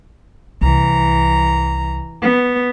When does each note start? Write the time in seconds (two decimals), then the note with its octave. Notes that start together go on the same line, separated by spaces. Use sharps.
0.61 C2 E3 A#5
2.22 B3